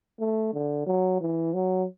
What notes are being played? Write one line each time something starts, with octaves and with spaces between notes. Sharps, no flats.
A3
D3
F#3
E3
F#3